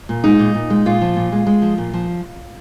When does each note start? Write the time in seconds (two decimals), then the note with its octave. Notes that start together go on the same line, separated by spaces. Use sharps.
0.09 A#2
0.24 G#3 D#4
0.39 A#2
0.54 A#2
0.70 G#3
0.85 A#2 F4
1.01 F3
1.16 A#2
1.32 G#3
1.47 G#3
1.62 F3
1.78 A#2
1.93 F3